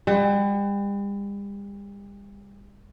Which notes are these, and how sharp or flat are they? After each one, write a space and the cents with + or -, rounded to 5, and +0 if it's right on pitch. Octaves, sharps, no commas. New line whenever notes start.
G3 +40 F#5 +35